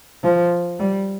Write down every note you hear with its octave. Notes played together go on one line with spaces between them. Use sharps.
F3
G3